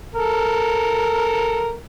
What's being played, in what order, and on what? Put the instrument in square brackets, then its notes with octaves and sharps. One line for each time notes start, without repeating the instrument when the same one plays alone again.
[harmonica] A4 A#4